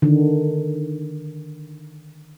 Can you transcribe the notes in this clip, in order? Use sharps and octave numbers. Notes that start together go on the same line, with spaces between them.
D3 D#3